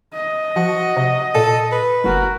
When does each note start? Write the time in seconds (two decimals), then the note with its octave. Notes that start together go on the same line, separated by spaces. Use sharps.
0.13 D#5
0.56 F3 F#4
0.96 C3
1.35 A#2 A4
1.72 B4
2.04 F#1 F#4 A#4